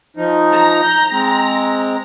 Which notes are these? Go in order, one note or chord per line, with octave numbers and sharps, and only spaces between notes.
F3 D#4
A#5
G6
G#3 C4